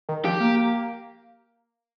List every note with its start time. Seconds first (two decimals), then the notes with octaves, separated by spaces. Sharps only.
0.09 D#3
0.25 F3 G4
0.40 A#3